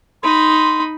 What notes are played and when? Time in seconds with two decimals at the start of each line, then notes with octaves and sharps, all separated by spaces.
0.23 D#4 B5 C6